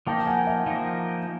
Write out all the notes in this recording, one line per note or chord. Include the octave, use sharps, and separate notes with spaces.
F3 A#3 D#4 G5 A5
F#5 G#5
E5 F#5
F3 A#3 D#4